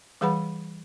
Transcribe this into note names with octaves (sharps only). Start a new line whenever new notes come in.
E3 G3 G#4 B4 F#5 B5